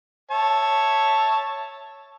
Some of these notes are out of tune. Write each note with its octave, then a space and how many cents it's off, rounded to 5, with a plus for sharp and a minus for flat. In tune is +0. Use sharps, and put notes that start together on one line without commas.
C#5 +0 E5 +0 A5 +0